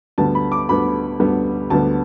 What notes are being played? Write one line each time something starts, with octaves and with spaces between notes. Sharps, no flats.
D2 D3 G3 B3 A5
B5
D6
D2 D3 G3 B3 B5
D2 D3 G3 B3
D2 D3 G3 B3 A5